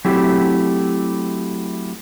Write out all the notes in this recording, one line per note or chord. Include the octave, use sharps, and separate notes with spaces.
F#3 A3 C4 E4 G4